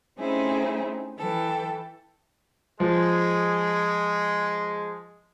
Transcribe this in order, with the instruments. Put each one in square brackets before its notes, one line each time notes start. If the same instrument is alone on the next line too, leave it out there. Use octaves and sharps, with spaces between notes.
[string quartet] A3 C4 C#4 D#4 E4 G#4
E3 A4 G5
[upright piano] F3 [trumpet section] G#3 G#4